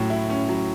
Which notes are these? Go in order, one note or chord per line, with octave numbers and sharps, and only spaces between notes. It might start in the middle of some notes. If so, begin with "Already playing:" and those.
Already playing: A2 F#3 C#4
E4
C#4
F#3